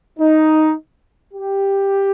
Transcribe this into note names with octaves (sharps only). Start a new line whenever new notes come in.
D#4
G4